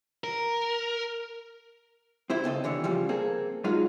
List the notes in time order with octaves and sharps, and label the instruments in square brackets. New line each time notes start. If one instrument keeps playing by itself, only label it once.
[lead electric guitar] A#4
[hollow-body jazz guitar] C4 E4 C5
C#3 C4 A4 D#5
D#2 D3 E3 C#5
F2 C#3 F3 G3
A#3 C4 G#4 A4
F#3 G#3 D#4 F4 F#4